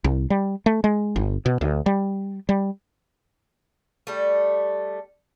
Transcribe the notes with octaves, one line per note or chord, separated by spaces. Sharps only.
C2
G3
A3
G#3
G1
B2
D2
G3
G3
G3 A3